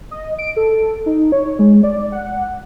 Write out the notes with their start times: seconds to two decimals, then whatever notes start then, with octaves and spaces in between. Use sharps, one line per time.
0.11 D#5
0.39 D7
0.56 A4
1.06 D#4
1.32 C#5
1.59 G#3
1.83 D5
2.12 F#5